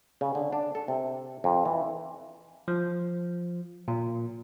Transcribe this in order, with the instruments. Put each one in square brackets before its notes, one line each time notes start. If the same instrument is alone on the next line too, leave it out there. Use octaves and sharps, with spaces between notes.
[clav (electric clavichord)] C#3
D3
D4
A4
C3
F2
E3
[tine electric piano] F3
A#2